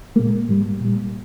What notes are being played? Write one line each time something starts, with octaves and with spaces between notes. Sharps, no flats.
A#2 G#3 A#3
G#2 G3
A#2 G3